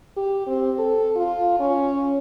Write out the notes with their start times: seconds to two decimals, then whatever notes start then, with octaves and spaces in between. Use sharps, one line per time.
0.17 G4
0.47 C4
0.78 A4
1.16 F4
1.59 C#4